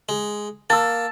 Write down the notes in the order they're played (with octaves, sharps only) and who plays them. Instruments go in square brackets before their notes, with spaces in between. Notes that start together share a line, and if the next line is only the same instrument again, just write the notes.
[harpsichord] G#3
[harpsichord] A#3 [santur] A5 E6